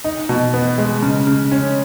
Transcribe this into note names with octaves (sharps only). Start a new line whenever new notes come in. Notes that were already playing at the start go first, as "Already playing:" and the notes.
D#4
B2
B3
G#3
C#3
C#3
C#4